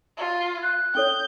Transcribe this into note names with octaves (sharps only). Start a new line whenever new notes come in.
F4
F#6
C#4 A4 C#5 G6